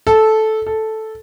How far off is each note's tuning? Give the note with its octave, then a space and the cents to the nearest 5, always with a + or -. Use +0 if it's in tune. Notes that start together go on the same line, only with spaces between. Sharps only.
A4 -10
A4 -5